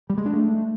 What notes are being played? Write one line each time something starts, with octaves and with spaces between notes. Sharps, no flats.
G3
G#3
D4
A3